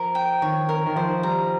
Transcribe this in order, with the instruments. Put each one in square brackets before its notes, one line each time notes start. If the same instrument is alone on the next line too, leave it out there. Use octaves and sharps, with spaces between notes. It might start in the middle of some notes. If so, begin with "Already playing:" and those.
Already playing: [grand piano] F3 [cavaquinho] A#4
[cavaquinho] G5
[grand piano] D#3 [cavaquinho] C#5
[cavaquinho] A#4
[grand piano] D#3
[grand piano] F3 [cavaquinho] C5
[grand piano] G3 [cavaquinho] A#5